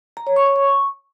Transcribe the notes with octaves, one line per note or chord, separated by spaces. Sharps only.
A#5
C#5
C#6
C#5
C#6